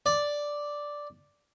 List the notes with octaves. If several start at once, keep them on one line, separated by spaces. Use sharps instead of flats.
D5